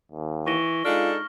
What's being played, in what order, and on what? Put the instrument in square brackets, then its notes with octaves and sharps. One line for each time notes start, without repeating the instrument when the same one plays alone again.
[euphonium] D#2
[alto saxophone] E3 [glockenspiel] C#6 A#6 G7
[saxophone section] G#3 D4 D#4 [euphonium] F4 [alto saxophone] A4 [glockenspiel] F6